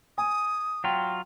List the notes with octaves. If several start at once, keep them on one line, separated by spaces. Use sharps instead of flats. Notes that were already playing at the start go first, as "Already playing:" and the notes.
G#5 D#6
F#3 F4 G5